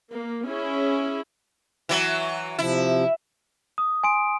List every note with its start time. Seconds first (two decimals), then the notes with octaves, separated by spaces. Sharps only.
0.11 A#3
0.46 C#4 E4 G#4
1.89 E3 F#3
2.59 C3 F3 E4
3.78 D#6
4.04 G#5 C6 D7